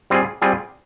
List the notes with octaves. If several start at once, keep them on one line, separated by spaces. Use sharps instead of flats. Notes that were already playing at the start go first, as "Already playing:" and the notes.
G3 C4 F4 G#4
G3 C4 F4 G#4